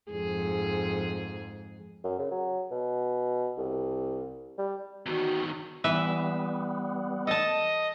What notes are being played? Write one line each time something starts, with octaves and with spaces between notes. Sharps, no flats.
F2 G#2 G#4
F#2
C#3
F#3
B2
C2
G3
E2 D#3 F#4
E3 G3 B3 B4 E5
A4 D#5 A5